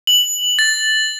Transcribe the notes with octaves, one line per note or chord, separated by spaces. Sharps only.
F#7
A6